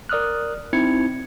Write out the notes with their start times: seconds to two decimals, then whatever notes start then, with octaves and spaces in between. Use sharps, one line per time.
0.09 A#4 D5 D#6 F6 F#6
0.73 C4 D#4 E4 G#6 C#7